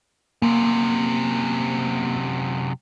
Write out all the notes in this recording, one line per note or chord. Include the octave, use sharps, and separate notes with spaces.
F#2 C3 A#3